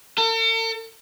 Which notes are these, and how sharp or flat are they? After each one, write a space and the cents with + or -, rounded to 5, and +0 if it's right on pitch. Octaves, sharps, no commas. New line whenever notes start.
A4 +45